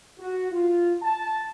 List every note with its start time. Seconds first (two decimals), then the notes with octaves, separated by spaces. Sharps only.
0.18 F#4
0.52 F4
1.02 A5